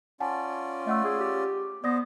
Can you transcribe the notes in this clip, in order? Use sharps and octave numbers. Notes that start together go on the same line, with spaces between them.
C#4 F4 D5 F#5 G#5 A5
A3 D#5 F#5 E6
G#4
G4
B3 C5 D5 D#6 A#6